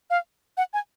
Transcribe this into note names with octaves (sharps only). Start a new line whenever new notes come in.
F5
F#5
G#5